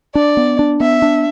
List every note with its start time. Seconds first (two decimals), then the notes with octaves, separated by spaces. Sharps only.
0.15 D4 D5
0.37 B3
0.59 D4
0.80 B3 E5
1.02 D4